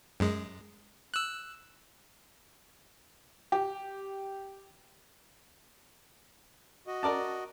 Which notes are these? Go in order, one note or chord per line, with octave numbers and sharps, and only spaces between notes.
F#2 G#3
E6 F#6
G4
F#4 D#5
A#4 D5 A5